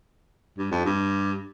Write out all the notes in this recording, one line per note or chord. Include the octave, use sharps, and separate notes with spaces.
G2
F2
G2